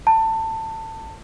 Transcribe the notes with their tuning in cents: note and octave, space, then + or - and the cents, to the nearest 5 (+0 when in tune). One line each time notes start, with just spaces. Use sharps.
A5 +20